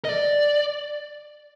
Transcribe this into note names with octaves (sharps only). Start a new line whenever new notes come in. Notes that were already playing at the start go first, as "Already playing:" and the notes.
D#5
D5